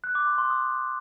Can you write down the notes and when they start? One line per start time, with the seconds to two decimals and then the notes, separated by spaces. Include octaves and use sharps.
0.04 F#6
0.15 D6
0.27 C6
0.38 C6
0.50 D#6